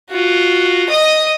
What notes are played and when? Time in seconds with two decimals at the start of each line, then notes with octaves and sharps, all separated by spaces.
0.10 F4 F#4
0.89 D#5 D#6